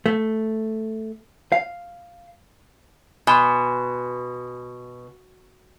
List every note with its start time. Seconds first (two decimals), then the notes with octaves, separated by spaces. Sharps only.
0.06 A3
1.52 F5
3.27 B2 G#5 C6